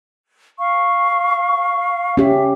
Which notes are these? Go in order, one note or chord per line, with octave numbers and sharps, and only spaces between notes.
F5 C#6
C#4 G4 E5